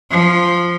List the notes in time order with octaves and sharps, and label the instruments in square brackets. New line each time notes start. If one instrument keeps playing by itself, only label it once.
[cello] F3